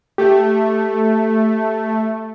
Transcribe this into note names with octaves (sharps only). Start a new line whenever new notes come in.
A3 G4